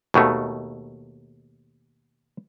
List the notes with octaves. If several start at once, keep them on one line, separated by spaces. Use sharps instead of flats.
D#2 B2 D#3 A3